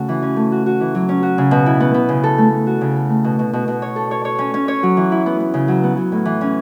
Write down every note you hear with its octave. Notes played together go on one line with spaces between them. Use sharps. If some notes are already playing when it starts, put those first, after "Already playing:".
Already playing: C#3 A3 F#4
E3
C#4
A3
F#4
F#4
E3
F#3
C#4
F#4
C#3
B2
E4
B3
B3
C#3
A4
A3
A3
F#4
C#3
A4
A3
B2
B2
B2
B2
C#5
A4
C#5
C#5
C#4
C#4
C#5
F#3
E3
E4
B3
B3
C#3
F#3
B3
F#3
A2
E3
C#4